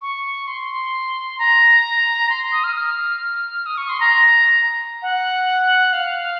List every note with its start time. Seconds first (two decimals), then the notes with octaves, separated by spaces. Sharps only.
0.02 C#6
0.47 C6
1.39 A#5
2.30 C6
2.52 D#6
2.64 F6
2.75 F6
3.66 D#6
3.78 C#6
3.89 C6
4.00 A#5
5.02 F#5
5.93 F5